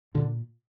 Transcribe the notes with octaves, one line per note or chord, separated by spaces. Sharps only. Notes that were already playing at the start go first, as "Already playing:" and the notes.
A#2 D3